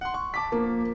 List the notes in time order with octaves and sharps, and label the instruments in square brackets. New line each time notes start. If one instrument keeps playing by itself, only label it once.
[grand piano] F#5 C6
C#6
A5 D6 B6
[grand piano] F3 [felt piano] A#3